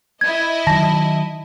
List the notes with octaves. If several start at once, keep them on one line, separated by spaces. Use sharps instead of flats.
E4 D#5 G#6
D#3 F#3 A5 A#6